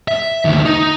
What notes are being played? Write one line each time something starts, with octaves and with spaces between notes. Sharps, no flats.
E5
D2 D#3
D#4